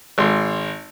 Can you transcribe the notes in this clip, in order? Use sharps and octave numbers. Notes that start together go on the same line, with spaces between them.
G#1 C6